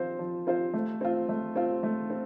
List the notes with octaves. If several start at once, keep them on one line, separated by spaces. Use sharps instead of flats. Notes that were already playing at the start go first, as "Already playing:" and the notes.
Already playing: F3 C4 F4 C5
F3
C4 F4 C5
A3
C4 F4
A3
C4 F4
A3
C4